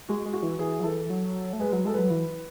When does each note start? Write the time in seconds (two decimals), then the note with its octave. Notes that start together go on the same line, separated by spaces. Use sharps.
0.09 G#3 F#4
0.25 G#3
0.33 F#4
0.43 E3
0.59 E3 G#4
0.80 F#3
0.84 E3 A4
1.10 F#3
1.53 A3
1.60 G#3 B4
1.72 F#3
1.85 G#3 A4
1.94 F#3 B4
2.10 E3